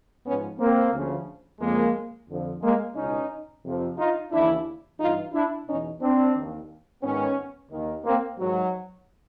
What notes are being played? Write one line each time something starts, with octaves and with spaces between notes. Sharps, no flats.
G#2 F3 B3 C#4
A#3 C4
D2 C#3 F3
F2 C#3 F3 G#3 A#3
F2 D3 F3
G#3 A#3
C#2 B2 C#4 D#4
F2 C3 F3
D#4 F4
D#2 C#3 E3 D4 E4
G2 E3 D#4 F4
D4 E4
E2 B2 C#4 D#4
C4 D4
D#2 D#3
G#2 D#3 B3 C#4
D#2 D#3
A#3 C4
G#2 D#3 F#3